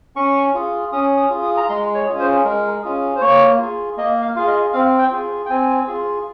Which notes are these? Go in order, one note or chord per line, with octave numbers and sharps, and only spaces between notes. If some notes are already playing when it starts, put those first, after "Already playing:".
C#4 C#6
F4 G#4
C#4 D#6
D#6
F4 G#4
D#6
A#5
G#3 C6
C#5
C#4 F4 G#4
C5
G#3 A#4
C#4 F4 G#4
C5
A#3 C#5
F4 G#4
A#3 D#5
F5
F4 G#4 F5
D#5
C4 F5
G5
F4 G#4
G5
C4 G#5
F4 G#4